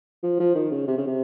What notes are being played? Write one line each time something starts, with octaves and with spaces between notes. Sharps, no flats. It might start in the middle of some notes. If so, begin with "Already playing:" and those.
F3
F3
D#3
C#3
C3
C#3
C3